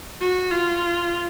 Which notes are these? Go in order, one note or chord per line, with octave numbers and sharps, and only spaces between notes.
F#4
F4